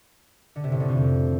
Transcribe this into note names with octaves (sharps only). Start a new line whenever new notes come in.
D3
C3
A2
D3
F2